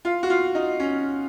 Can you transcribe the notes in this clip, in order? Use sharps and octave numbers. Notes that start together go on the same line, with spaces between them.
F4
F#4
F4
D#4
C#4